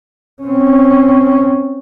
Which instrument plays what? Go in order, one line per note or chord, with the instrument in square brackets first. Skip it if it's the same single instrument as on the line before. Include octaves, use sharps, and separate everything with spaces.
[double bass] C4 C#4